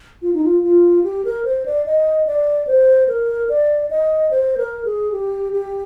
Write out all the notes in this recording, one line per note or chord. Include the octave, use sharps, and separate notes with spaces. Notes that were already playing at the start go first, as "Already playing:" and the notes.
F4
D#4
F4
F4
G4
A#4
C5
D5
D#5
D5
C5
A#4
D5
D#5
C5
A#4
G#4
G4
G4